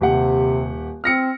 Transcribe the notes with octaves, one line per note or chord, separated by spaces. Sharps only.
D#1 C3 G4 F#5
C4 F6 A#6 C#7